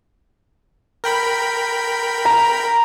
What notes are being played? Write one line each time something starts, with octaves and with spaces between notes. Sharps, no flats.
A#4 G5 B5
A#5